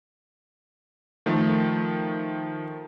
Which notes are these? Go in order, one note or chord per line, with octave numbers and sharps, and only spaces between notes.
D#3 F3 A3